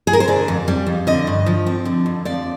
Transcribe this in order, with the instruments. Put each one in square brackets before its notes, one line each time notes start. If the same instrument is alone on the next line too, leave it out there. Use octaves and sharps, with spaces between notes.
[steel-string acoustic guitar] G#4
A#4
C5
D3 D5
F2
G3
F2
D3 D#5
G2
F3
C4
D3
F2
F3 D5